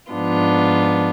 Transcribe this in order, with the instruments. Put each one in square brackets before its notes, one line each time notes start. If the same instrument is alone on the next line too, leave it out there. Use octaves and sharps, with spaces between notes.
[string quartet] G#2 F3 B3 D4 F4